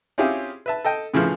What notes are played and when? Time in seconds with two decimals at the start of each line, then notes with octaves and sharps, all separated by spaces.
0.18 C4 C#4 E4 F4 G4 G#4
0.66 B4 E5 A5
0.85 A4 D#5 G5
1.14 A2 C#3 E3 F3